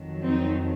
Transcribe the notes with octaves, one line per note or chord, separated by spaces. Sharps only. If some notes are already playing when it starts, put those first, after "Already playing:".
Already playing: F2 D#3 F#3
C4 D#4